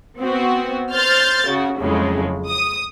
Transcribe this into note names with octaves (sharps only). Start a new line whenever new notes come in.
B3 C4 F#4
C5 F6 G6 A6
C#3 F#4
F2 A2 C#3 F#3 G#3
D#6